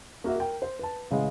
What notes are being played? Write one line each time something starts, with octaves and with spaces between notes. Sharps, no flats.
A#3 F#4 A#4 E5
A#4 G5
C5
B4 A5
A1 C#3 G#3